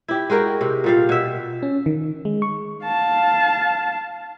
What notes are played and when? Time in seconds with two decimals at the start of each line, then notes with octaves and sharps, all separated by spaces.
0.08 E4 G4
0.30 G#3 F#4 A#4 G5
0.61 C3
0.84 A#2 G3 F5
1.09 B2 E5
1.63 C#4
1.86 D#3
2.25 G#3
2.42 C#6
2.85 F5 A5